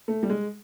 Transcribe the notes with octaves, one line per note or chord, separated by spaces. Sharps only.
A3
G3
G#3